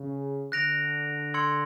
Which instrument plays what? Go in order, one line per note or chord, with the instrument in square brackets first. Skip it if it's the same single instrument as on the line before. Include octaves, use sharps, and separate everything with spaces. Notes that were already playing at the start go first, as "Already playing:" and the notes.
Already playing: [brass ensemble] C#3
[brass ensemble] D3 [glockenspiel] F#6 A#6 D7 F7
[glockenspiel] C6 E6 G#6 C#7 F#7